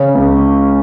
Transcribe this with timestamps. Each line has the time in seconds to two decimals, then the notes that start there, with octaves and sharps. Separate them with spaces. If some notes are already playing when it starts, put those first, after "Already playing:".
Already playing: C#3 C#4
0.15 C#2